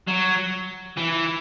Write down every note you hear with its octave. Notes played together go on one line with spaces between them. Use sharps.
F#3
E3